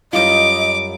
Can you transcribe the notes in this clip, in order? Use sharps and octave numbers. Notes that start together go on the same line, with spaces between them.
F#2 G3 F4 D#5 D6